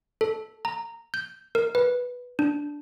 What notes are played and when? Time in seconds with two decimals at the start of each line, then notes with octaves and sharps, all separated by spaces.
0.21 A4
0.65 A#5
1.14 G6
1.55 A#4
1.75 B4
2.39 D4